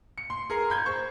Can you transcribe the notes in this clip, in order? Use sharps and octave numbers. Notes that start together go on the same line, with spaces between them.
C#7
C6
G#4 A#4 A#5
B5 G6 G#6
C5 C#6